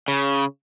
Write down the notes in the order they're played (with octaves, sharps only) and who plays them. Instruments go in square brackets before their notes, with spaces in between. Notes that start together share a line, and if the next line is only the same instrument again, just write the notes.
[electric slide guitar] C#3